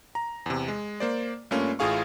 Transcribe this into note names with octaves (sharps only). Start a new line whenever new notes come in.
A#5
E2 C3
G#3
A#3 C5 D5
G2 A3 A#3 C#4 F4
A1 A2 F4 G#4 F5 C#6